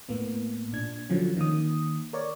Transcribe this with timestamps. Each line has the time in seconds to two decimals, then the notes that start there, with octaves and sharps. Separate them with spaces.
0.09 A2 A#3 B3
0.73 A#2 D4 G#6
1.09 D3 F3 F#3 C#4
1.37 D#3 A#3 D#6
2.13 A#4 C#5 D5